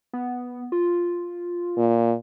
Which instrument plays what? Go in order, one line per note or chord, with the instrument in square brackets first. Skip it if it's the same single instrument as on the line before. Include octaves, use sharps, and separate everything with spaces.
[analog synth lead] B3
F4
[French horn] A#2